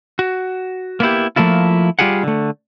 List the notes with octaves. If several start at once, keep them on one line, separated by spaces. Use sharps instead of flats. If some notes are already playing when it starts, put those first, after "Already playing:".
F#4
A#3 B3 E4 G4
F3 A3 A#3 E4 F4
G3 F4 G4 G#4 F#5
D3 A3